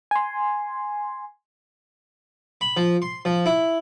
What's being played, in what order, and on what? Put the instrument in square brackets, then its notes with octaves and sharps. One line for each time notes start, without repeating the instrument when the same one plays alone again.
[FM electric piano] G#5 C6
[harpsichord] B5
F3
C6
F3
E4